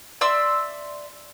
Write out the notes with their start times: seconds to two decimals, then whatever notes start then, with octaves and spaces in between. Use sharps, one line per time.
0.21 D5 E5 C6 E6